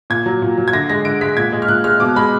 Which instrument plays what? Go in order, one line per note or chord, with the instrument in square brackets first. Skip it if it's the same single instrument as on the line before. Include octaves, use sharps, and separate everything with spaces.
[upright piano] A#2 G#6
F#3
A#2
F#3
G#6
D3 A#6
G#3 A#6
D3 D7
G#3 B6
A#2 G#6
G#3
F6
A#2 F#6
G#3 F6
B2 D6
G#3 B5